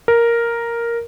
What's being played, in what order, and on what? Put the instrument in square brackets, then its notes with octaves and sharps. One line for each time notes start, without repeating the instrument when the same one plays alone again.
[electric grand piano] A#4